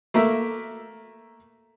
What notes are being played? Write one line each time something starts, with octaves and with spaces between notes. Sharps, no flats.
A3 A#3 A#4 E5